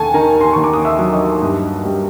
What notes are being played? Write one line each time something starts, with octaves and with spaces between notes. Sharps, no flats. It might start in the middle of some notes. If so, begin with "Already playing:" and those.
Already playing: D#2 A4 G#5 A5
D#3 A#4 A#5
C6
D#2 C#6
D6
D#6
E5 E6
F#3
D#5 D#6
G2
G3